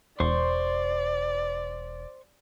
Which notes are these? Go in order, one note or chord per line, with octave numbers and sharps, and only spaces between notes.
E1 C5 D5 C6 C#6